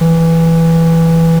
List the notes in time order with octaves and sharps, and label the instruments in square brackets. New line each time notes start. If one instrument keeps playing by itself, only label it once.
[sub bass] E3